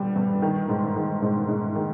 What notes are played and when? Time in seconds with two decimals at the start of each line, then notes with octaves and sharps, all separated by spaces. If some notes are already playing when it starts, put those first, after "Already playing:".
Already playing: G2 D3 G3
0.16 G2
0.42 D#3
0.69 G#2
0.96 D#3
1.22 G#2
1.49 G#2
1.75 D#3